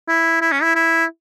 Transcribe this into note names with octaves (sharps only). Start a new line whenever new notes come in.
E4
E4
C#4
E4
E4